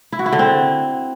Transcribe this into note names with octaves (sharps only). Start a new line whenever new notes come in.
E4
F#4
E4
D3
C4